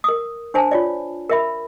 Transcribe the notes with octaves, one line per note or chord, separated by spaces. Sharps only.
A#4 D#6
D4 C5 G#5 A5
F4 C#5 D5
A#4 E5 B5